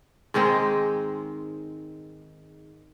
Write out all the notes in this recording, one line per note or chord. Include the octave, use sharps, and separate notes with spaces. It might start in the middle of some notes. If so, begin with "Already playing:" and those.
G#2 D#3 G#3 C4